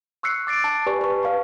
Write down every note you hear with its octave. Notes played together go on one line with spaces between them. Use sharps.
C#6 E6 F#6 C7 C#7
D6 A6 C7 D7
A5
G4 B4 D5 G#5 A5 C#6
B4 C#6
B4 F5 C#6